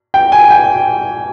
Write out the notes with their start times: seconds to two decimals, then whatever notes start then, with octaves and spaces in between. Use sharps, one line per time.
0.14 G5
0.32 G#5
0.51 G5